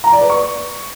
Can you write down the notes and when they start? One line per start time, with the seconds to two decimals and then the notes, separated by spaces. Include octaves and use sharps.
0.04 A#5
0.13 D5
0.21 B4
0.30 C#6